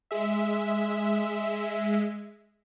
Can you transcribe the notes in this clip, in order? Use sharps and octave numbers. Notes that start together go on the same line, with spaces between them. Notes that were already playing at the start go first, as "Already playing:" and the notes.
G#3 E5